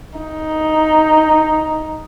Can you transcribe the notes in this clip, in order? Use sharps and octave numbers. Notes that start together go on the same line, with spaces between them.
D#4